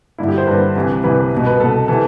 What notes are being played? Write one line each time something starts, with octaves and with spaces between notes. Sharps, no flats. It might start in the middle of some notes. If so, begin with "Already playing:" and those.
G2 D3 E4
G4
C5
G2 D3 B4
C2 C3 E3
C2 C3 E3 B4
C2 B2
B4
C2 B2 A4
C3 E3 A4